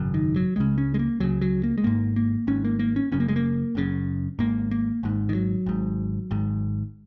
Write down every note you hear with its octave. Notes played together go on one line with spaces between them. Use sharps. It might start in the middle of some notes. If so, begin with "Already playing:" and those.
Already playing: G#1 F#2 C#3
D#3
F#3
C#2 C#3 G#3
C#4
G#3
A#3
C#2 C#3 F#3
F#3
A#3
G#3
G#1 G#2 A#3
A#3
G#1 G#2 C#4
A#3
A#3
C#4
F#1 F#2 C#3 C#4
A#3
G#3
A#3
F#1 F#2 C#3
G#1 G#2 A#3
A#3
G#1 G#2
D#3
F#3
G#1 G#2
G#1 G#2